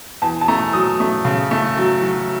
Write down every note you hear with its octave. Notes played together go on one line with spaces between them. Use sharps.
E2 A5
A5
A3 A#5
F#3 D#6
A3
C#3
A3
F#3
F#3